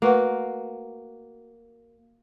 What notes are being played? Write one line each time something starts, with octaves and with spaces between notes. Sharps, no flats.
A3 A#3 F#4 B4 F#5